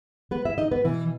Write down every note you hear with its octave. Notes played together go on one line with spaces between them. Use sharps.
B3 B4
E4 E5
D#4 D#5
B3 B4
B2 E3 E4